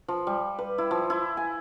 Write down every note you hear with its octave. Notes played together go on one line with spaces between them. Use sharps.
F3
G3
B4
E4
F3
E4
G#5